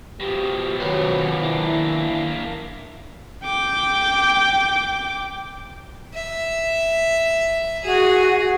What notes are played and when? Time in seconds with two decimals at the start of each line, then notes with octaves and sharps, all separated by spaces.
0.20 B2 F3 G4
0.80 D#3 F#3 B4 C5
1.43 A#3 D4 E4
3.44 G5 D6
6.15 E5
7.84 F#4 G#4